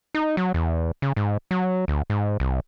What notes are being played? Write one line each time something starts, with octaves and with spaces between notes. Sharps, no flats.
D#4
F#3
E2
C#3
G#2
F#3
D2
G#2
C2